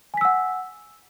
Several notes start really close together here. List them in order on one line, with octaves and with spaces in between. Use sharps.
G#5 B6 E6 F#5